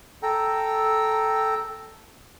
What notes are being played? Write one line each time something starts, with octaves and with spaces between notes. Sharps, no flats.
A4 G5 A#5